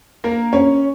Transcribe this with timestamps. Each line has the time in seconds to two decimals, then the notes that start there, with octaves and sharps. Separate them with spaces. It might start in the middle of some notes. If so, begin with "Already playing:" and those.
0.24 A#3 A#4
0.53 C#4 C#5